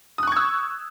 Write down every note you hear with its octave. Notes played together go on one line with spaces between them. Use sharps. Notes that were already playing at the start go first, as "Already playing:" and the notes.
C#6 D#6 E6 F#6 G#6